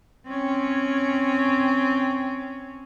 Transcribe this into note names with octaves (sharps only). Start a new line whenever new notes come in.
C4 C#4